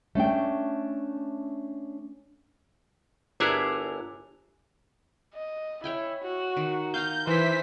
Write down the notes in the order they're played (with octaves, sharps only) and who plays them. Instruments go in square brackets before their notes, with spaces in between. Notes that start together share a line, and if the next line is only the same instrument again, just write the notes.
[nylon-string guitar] A3 C#4 D4 G5
[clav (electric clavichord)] G1 E4 C#5 [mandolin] D4 G#4 A#4
[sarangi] D#5
[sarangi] E4 [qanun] C#5 G5 G#5
[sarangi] F#4
[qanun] D#3
[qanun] F5 G#5 A#5 [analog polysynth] G6
[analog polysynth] E3 B6 [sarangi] C5